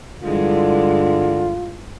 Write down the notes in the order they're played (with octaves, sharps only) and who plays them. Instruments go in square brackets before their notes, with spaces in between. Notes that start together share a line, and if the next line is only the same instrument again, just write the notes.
[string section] G2 E3 G#3 [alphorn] D3 [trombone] F4